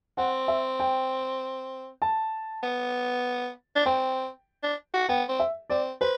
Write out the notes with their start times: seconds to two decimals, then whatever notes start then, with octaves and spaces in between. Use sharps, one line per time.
0.17 C4 F#5
0.48 E5
0.80 G5
2.02 A5
2.63 B3
3.76 D4
3.86 C4 G5
4.63 D4
4.94 F#4
5.09 B3 G5
5.29 C4
5.39 E5
5.70 C4 D5
6.01 B4 C5